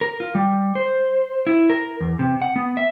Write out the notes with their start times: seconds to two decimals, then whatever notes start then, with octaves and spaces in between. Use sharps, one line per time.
0.01 A#4
0.20 F4
0.35 G3
0.75 C5
1.47 E4
1.70 A#4
2.01 E2
2.19 C3
2.42 F#5
2.56 B3
2.77 E5